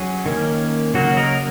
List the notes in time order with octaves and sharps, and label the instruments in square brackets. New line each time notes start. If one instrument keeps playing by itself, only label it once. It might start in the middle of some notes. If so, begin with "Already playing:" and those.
Already playing: [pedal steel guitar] F#3 C#4 G#4
D#3 A#3 C#4
C#3 F#3 A#3 F#4
A#4 D#5